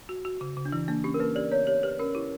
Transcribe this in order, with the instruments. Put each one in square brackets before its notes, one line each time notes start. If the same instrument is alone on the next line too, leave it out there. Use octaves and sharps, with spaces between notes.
[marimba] F#4
F#4
C#3
C#3
[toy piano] D4
[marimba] E3 [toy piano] E4
[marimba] A#3 [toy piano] D4
[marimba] C#4 [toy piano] G4
[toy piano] A#4
[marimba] A#3 [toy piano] B4
[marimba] G4 [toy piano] D5
[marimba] B3 [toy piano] C#5
[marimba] G4 [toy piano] C#5
[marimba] G4 [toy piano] B4
[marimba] C#4 [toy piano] A#4
[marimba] E4 [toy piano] G4